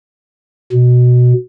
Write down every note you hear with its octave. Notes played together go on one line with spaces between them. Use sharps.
B2